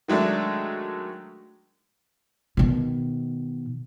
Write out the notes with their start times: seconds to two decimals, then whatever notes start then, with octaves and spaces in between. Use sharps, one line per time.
0.08 D#3 F#3 G#3 A3 D4
2.57 B2 D#3